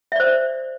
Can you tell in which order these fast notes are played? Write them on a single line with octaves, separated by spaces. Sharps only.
E5 D5 C5